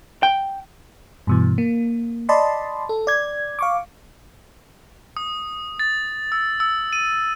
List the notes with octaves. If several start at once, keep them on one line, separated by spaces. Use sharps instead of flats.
G5
G2 B2 E3
A#3
D5 D#5 A5 B5 C6
A4
D5 G#6
F5 C#6 D6
D#6
A6
E6
E6
D#7